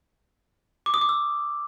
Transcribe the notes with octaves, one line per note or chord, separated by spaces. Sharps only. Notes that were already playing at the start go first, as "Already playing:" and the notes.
D6
D#6
D6
E6